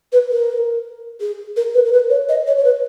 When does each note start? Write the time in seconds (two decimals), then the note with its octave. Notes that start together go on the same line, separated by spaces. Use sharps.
0.12 B4
0.31 A#4
1.20 G#4
1.56 A#4
1.74 B4
1.85 A#4
1.92 B4
2.10 C#5
2.29 D#5
2.47 C#5
2.57 C#5
2.64 B4